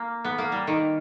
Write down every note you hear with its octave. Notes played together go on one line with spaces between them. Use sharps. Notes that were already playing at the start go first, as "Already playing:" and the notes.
Already playing: A#3
B3
A#3
G3
D#3